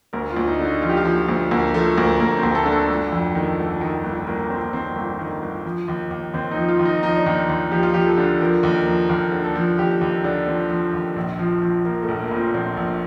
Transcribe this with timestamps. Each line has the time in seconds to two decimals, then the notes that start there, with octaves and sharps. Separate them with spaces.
0.13 D2 A#4
0.31 F4
0.36 D2
0.48 D#4
0.59 D3
0.65 D#4
0.82 F3 F4
0.89 G4
0.97 F4
1.05 F3
1.29 D2
1.51 D2 A#3
1.74 F3 A3
1.97 D2 A#3
2.20 D2 A#3
2.37 C4
2.43 D2
2.55 A4
2.66 D3
2.72 A4
2.89 G1
3.12 F2
3.35 D#3
3.58 G1
3.81 D#3
4.04 G1
4.27 G1 A#3
4.50 G1 C4
4.73 D#3 C4
4.96 G1
5.19 D#3
5.42 G1
5.64 F3
5.88 D#2
6.11 D#2
6.34 D#2 C4
6.51 D#4
6.56 F3
6.68 F4
6.79 D#2
6.85 D#4
7.03 F3 D#4
7.16 D4
7.26 D#2 D#4
7.49 D#2
7.71 F3 G4
7.83 F4
7.94 F3 G4
8.06 A4
8.18 D3
8.41 F3 A#4
8.63 D#2
8.75 A#4
8.86 F3
9.09 D#2 A#4
9.32 D3
9.44 A4
9.56 F3
9.78 D#2 G4
10.01 D#2
10.24 D3 D4
10.47 F3 C4
10.70 F3
10.93 D#2
11.16 A#1
11.39 F3
11.62 F3
11.85 F3 A#3
12.02 A3
12.08 A#1
12.20 A#3
12.31 A#2
12.36 C4
12.54 A#1 C4
12.77 A#1